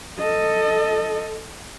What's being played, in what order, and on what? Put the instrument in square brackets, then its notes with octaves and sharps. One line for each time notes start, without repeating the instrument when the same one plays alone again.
[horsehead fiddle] A4 D#5